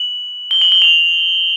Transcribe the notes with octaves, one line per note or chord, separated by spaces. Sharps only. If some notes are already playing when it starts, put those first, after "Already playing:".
Already playing: F#7
G7
F#7
G7
F7